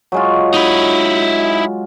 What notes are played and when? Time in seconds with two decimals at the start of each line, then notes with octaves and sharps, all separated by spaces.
0.12 F#3 G#3 F4
0.54 D#4 E4